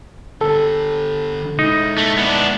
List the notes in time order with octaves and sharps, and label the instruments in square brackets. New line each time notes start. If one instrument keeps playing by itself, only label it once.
[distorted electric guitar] D3 G4 [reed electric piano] A4
[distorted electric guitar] G#3 E4 [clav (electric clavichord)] D#4
[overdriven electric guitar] A3
B3 D4